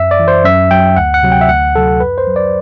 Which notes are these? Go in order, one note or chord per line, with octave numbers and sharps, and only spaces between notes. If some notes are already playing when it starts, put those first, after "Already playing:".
Already playing: F#2 E5
D5
E3
C5
F#2 E5
F#3 G5
D2 F#5
F#5
C3 F#3
G5
E5
D2 F#5
C3 F#3 A4
F#2 B4
C5
F#3
D5